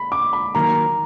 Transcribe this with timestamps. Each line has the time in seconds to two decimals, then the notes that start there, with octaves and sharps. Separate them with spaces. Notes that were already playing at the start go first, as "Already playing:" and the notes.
Already playing: B5
0.12 D6
0.33 B5
0.55 D#3 F#3 A#3 A#5